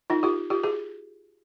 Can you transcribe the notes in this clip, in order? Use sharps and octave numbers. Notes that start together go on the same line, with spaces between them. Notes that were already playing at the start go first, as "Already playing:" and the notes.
D#4 F4
F4 G4
F4 G4
F#4 G#4